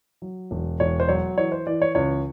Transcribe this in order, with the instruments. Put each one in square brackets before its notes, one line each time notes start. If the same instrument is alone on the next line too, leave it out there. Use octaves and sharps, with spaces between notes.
[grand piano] F#3
E1
E1 C#5
C5
F#3 C#5
E3 C#5
C5
E3 D5
C#5
C#2 C#5